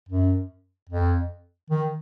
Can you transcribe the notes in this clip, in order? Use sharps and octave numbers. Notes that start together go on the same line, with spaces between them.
F#2
F2
D#3